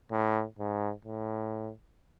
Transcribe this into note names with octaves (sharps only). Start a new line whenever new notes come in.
A2
G#2
A2